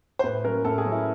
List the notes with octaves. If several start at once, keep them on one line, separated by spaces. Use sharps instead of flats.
C5
A2 B4
F#3 A#3 C#4 A#4
A2 A4
G#4
F#3 A#3 C#4
E4